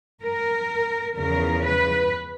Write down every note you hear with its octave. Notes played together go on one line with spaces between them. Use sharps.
A#4
E2 C#3 F3 A#4
B4